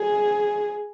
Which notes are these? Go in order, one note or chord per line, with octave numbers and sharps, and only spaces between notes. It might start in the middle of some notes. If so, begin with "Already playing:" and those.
Already playing: G#4